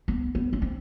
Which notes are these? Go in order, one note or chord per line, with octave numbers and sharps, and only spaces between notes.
B3
B3
C#4
C4